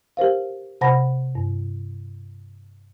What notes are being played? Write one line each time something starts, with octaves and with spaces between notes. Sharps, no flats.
G4 A#4 C5 F5
C3 C5 F#5 A5 B5 A#6
G2